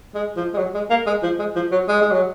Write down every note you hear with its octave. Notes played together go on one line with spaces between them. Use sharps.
G#3
F3
G#3
F#3
G#3
A#3
G#3
F3
G#3
F3
F#3
G#3
G#3
F#3